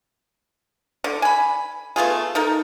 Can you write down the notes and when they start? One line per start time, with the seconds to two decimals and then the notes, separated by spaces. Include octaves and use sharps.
1.04 D3
1.22 G#5 B5
1.96 A3 B3 F4 G#4
2.35 D#4 A4 A#4